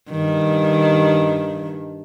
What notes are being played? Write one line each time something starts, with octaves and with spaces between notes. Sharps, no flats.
G2 D#3